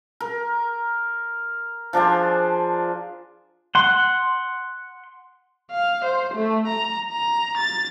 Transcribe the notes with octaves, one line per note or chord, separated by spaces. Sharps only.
A#4
F3 D4 G#4 C5
F#5 C6
F5
C5
A3
A#5
A#5
A6